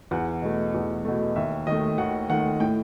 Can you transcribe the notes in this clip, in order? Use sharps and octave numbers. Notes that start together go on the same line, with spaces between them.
E2 F#5
B2 A3
E2
B2 A3
D#2 E5
D#3 A3 D#5
D#2 F#5
D#3 A3 F#5
A2 G5